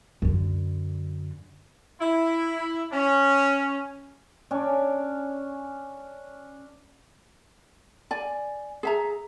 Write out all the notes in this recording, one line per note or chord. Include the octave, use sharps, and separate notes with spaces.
F#2 D3
E4
C#4
C#4 D4
D5 G#5
G#4 E5 A#5